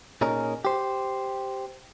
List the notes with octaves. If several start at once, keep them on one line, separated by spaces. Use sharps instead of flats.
A#2 C#4 D#4 G#4 A#4
G4 C5